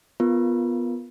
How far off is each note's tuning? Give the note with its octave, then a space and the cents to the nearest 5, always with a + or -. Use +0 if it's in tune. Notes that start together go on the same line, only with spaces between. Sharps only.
B3 +0 F4 +0 A#4 +0